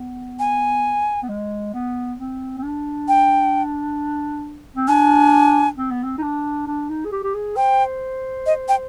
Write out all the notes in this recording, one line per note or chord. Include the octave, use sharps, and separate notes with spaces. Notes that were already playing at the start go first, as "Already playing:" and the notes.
Already playing: B3
G#5
B3
G#3
B3
C4
C4
D4
G5
C4
D4 G#5
C4
B3
C4
D#4
D4
D4
D#4
G#4
G4
G4
G#4
C5 G5
D#5
G5